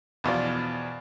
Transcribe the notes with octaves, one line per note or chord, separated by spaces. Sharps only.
E2 B2 F3 D5